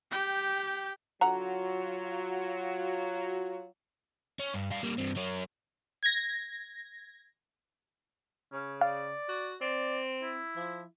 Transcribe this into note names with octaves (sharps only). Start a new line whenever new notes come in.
G4 G5
D3 F#3 F4 F#4 F#5 A#5
C#4
G2
G3 F5
G3 A#3
G2 C4
F#3 C#4
G#6 A#6
C#3 C#4
D5 F5
F#4
C4 D5
E4
F3